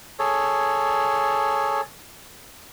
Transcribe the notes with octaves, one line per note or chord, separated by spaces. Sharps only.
G#4 A4 C#5